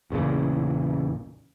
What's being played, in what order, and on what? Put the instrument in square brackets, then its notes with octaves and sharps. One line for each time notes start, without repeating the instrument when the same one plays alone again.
[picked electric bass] A1 E2 A#2 C#3